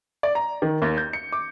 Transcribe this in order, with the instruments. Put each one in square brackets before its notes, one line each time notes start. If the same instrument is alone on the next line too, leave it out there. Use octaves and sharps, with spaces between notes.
[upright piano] D5
A#5
D#3
D#2
G6
C#7
D6